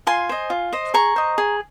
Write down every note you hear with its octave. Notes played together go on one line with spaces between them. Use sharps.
F4 G#5 C6
C5 D#5
F4
C5 D#5
G#4 A#5 C#6
C5 D#5
G#4